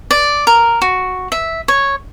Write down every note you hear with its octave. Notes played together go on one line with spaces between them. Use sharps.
D5
A#4
F#4
E5
C#5